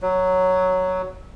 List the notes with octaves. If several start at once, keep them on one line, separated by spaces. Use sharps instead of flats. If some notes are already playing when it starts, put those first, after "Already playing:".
F#3